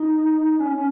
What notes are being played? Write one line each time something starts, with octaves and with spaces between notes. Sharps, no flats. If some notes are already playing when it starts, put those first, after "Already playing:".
Already playing: D#4
C#4
C#4